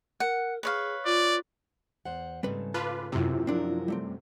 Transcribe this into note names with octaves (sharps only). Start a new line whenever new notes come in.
A#4 F#5
G#4 B4 C#5 F5
F4 D5
E2 C5 F#5
G#2 C#3 G3 A3 C4 B4
F4 B4 A5 D6
F#2 C3 E4 F4
F3 F#3 C4 D4 A#4
G3 A3 C4